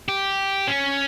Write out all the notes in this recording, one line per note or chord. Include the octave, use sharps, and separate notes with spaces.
G4
C#4